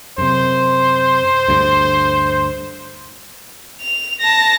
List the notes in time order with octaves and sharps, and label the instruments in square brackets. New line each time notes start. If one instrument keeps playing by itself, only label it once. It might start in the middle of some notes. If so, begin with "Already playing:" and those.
[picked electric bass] F#2 C3 [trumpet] C5
[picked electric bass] D2 G2
[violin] F7
A5 A#6